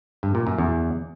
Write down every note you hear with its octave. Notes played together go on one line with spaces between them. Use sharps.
G2
A#2
F#2
E2